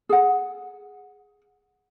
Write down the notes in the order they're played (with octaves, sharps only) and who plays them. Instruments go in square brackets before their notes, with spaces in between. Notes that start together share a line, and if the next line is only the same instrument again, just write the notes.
[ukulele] G#4 F#5